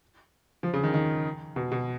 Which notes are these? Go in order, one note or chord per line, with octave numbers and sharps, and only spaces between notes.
F3
C#3
D#3
D#3
B2
B2